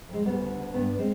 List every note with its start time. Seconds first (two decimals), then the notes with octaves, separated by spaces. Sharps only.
0.09 F2 G#3
0.25 D2 G3 B3
0.41 D3
0.58 D2
0.74 G2 B3 D4
0.98 G#3 C4